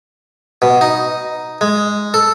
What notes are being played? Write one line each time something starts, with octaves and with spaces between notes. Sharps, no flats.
B2
D#4
G#3
A4